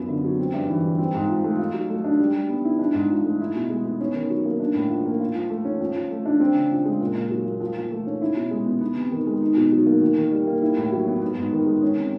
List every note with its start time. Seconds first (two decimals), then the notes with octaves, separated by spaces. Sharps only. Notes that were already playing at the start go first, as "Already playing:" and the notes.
Already playing: F#2 F3 B3
0.09 D3
0.24 F#3
0.39 C4
0.54 G2
0.69 E3
0.84 G3
0.98 C4
1.15 G#2
1.30 F3
1.44 A3
1.59 F4
1.74 F#3
1.90 A3
2.04 D4
2.20 G3
2.34 G3
2.49 B3
2.65 E4
2.79 D4
2.94 G#2
3.10 F3
3.24 A3
3.40 E4
3.55 B2
3.70 G#3
3.85 B3
4.00 C#4
4.15 D#3
4.30 F#3
4.45 A#3
4.60 D4
4.75 A2
4.90 F3
5.05 A#3
5.20 F4
5.35 F3
5.50 A3
5.65 C#4
5.81 F3
5.95 F3
6.11 A3
6.26 D4
6.40 C4
6.55 C#3
6.71 F3
6.85 G#3
7.00 A#2
7.15 A#2
7.30 F#3
7.45 A#3
7.60 F3
7.76 F3
7.91 A3
8.06 C#4
8.22 E4
8.36 B2
8.51 G#3
8.66 B3
8.81 B3
8.96 C3
9.12 D#3
9.27 G#3
9.41 D#4
9.57 B2
9.72 F#3
9.86 A#3
10.01 D#3
10.17 D#3
10.32 G3
10.47 A#3
10.62 E4
10.77 A2
10.92 F#3
11.07 B3
11.21 B3
11.37 G#2
11.52 D#3
11.66 G#3
11.83 C#4
11.97 C3